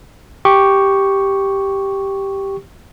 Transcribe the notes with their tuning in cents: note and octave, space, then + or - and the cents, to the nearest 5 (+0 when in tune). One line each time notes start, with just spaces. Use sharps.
G4 +0 C#6 +0